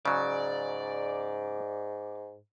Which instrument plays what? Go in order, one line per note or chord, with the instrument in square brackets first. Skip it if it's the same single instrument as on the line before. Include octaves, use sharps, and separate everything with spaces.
[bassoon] G#2 [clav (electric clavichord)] C#3 F#3 [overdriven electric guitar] D5